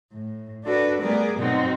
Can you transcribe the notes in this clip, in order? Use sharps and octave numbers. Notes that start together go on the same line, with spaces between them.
A2
D4 F#4 A4 B4 D5
G3 A3 B3 G#4 A#4 D5
B2 F#3 C4 D#4 F#4